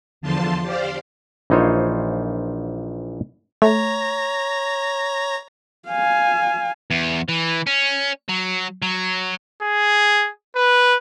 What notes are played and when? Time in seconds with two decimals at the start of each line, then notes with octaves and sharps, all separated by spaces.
0.21 E2 D3 F3 F4 A5 C6
0.63 G4 C5 D5 F5
1.50 A#1 E3 D#4 F4 C5 C#5
3.62 A3 C#5 A#5 A#6
5.88 F5 G#5
6.91 E2
7.29 E3
7.67 C#4
8.29 F#3
8.82 F#3
9.63 G#4
10.56 B4